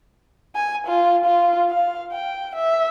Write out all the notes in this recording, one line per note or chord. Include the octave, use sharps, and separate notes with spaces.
G#5
F4
F4
F5
G5
E5